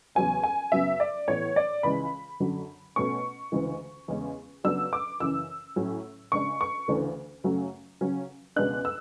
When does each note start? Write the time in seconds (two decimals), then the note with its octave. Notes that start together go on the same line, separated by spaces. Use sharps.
0.15 E2 C#3 F#3 C#4 G#5
0.43 G#5
0.72 F#2 C#3 F#3 B3 E5
1.00 D5
1.28 A2 E3 B3 C#5
1.56 D5
1.83 C#2 C#3 E3 G#3 B5
2.40 F#2 D3 F#3
2.96 B2 A3 C#4 C#6
3.52 D2 C#3 E3 G#3
4.08 E2 C#3 G#3 C#4
4.64 C#3 F#3 B3 D4 E6
4.93 D6
5.20 F#2 C#3 E3 E6
5.76 A2 F#3 C#4
6.32 C#3 G#3 D4 C#6
6.61 C#6
6.88 D2 C#3 E3 A3 D4
7.44 F#2 C#3 F#3 A3 C#4
8.01 C#3 F#3 C#4
8.56 C#2 B2 G#3 B3 D4 F#6
8.85 E6